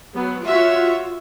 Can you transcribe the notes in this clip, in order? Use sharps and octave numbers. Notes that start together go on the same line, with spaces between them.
F#3 B3
F4 F#4 C#5 E5